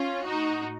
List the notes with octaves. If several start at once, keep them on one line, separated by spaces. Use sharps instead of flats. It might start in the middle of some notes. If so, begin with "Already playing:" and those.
Already playing: C#4 F4
A2 D#4 F#4